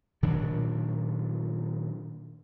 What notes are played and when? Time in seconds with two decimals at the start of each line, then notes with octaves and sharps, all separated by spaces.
0.23 A#2 D#3 F#3 D4